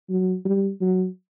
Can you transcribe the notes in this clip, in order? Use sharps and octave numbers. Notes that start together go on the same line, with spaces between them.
F#3
G3
F#3